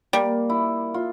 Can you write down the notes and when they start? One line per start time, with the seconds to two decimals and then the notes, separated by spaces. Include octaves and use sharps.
0.13 G3 A#3
0.50 E4
0.94 F4